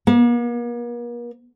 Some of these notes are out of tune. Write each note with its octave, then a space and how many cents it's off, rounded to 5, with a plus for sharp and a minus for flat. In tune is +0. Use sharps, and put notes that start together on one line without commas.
A#3 +45